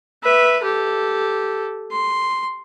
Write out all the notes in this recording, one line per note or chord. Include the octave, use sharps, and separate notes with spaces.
B4 E5
G4 A4
C6